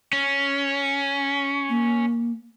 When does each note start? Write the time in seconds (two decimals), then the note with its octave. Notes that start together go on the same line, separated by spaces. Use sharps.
0.13 C#4
1.69 A#3